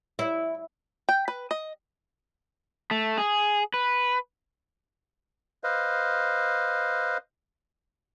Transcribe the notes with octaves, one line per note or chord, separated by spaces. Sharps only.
E4
G5
B4
D#5
A3
G#4
B4
B4 C5 D#5 F5